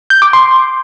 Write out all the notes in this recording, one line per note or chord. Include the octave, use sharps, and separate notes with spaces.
G6
D6
C6